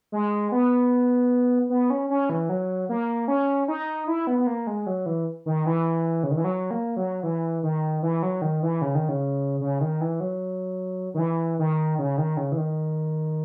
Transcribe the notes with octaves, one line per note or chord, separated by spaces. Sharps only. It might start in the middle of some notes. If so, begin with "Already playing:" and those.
G#3
B3
B3
C#4
C#4
E3
F#3
A#3
C#4
D#4
E4
B3
B3
A#3
G#3
F#3
E3
D#3
E3
C#3
D#3
E3
F#3
A#3
F#3
E3
D#3
E3
F#3
D#3
E3
C#3
D#3
C#3
C#3
D#3
E3
F#3
D#3
E3
D#3
C#3
D#3
C#3
E3
D#3